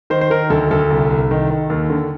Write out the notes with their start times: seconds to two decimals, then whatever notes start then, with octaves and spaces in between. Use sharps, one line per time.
0.10 D#3 C5
0.21 C5
0.30 D#3 A#4
0.50 D2 A4
0.71 D2 A4
0.90 C2
1.10 C2
1.31 D#3
1.50 D#3
1.70 D#2
1.90 D3